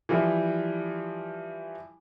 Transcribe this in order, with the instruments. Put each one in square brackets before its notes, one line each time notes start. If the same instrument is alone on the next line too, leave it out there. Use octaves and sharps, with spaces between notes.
[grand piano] E3 F3 G3 E4